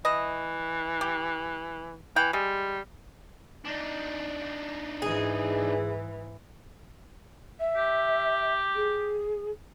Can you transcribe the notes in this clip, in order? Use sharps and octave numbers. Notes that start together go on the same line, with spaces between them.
E3 E4 D#5
G4
E3 G5
G3 G#3
D4 D#4
G#2 E3 G#4
E5
G4
G#4